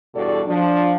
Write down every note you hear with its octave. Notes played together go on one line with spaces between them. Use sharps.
E2 G2 B2 F#4 A4 D5
F3 D4